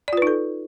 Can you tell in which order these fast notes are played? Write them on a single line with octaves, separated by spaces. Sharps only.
D5 F4 B4 D#4 A4